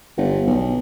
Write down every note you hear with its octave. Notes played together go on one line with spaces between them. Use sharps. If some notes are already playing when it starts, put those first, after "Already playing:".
G1
B1